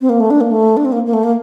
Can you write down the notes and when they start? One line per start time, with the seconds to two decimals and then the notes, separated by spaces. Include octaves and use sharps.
0.01 C4
0.09 A#3
0.20 A3
0.30 D4
0.41 A#3
0.51 A3
0.77 D4
0.85 C4
0.92 A#3
1.06 A#3
1.13 A3
1.23 A#3